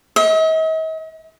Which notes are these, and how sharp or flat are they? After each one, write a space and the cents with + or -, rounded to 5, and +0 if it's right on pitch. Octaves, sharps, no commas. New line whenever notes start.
D#5 +45